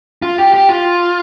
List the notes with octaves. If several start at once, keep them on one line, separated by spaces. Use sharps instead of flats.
F4
G4
G4
F4